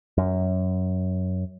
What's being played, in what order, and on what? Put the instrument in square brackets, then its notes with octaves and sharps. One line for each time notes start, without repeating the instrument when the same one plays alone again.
[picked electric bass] F#2